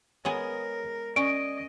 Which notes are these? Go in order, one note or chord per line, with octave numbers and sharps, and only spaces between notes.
G#3 B3 G#4 A#4 C#5
C#4 D5 D#5 D7